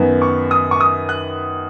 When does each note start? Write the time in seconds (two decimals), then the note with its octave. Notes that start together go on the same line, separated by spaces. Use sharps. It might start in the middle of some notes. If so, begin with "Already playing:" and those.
Already playing: F#2 D#3 B3
0.22 C#6
0.51 D#6
0.71 C#6
0.80 D#6
1.09 F#6